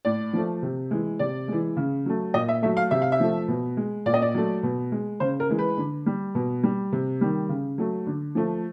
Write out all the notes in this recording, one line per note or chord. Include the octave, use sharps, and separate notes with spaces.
A2 D5
F3 A3
C3
E3 G#3
C3 D5
E3 G#3
C#3
F#3 A3
A#2 D#5
E5
F#3 A3 E5
F5
C3 E5
F5
E5
F3 A3
B2
G#3
A#2 D5
D#5
D5
F#3 A3
B2
G#3
C#3 C5
A#4
E3 G#3
B4
D3
G3
B2
G3
C3
D#3 G3
C#3
F#3 A3
D3
F3 A3